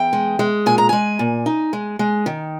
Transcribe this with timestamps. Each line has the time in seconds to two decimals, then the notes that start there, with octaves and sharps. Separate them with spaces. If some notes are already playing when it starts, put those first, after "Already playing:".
Already playing: E2 G5
0.13 G#3
0.39 G#3
0.66 A#2 G#5
0.78 A#5
0.89 G#3 G#5
1.19 A#2
1.46 D#4
1.73 G#3
1.99 G#3
2.26 D#3